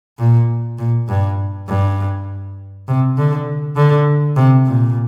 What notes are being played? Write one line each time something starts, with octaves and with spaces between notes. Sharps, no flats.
A#2
A#2
G2
G2
C3
D3
D3
C3
A#2